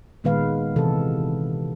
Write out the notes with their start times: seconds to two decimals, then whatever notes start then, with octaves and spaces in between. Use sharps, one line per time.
0.24 A#2 D#3 G#3 B3 B4 F5
0.76 C3 E3 A4